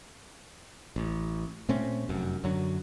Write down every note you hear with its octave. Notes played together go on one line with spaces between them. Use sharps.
A1
A#2 A3 C4 C#4
F1 F#2
F#2 D3 F#3